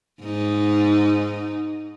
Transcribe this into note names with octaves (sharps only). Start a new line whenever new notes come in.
G#2 D#4